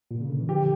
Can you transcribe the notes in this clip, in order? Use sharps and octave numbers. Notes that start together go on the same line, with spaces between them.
A#2
C#3
D3
E3
D3 F3 G4